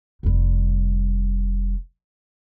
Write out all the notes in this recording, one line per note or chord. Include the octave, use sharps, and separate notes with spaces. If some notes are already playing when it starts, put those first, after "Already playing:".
F1 G3